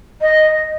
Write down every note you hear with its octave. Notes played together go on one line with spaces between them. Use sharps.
D#5